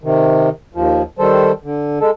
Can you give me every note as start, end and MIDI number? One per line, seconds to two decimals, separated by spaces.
0.04 0.49 48
0.04 0.49 51
0.75 1.02 39
0.75 1.02 53
1.19 1.52 51
1.19 1.52 55
1.19 1.52 69
1.19 1.52 72
1.64 1.99 50
2.01 2.10 56
2.01 2.10 69